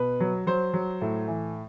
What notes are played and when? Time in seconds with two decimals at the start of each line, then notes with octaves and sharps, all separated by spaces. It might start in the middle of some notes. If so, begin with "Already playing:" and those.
Already playing: B2 B4
0.20 F#3
0.47 F#3 C5
0.73 F#3
1.02 A2
1.28 E3